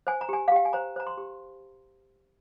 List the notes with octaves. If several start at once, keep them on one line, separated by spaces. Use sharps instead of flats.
C5 G#5
A#5
G4 G#5
F5
G4 G5
G#5
C5 A#5
C5 A#5
C6
G4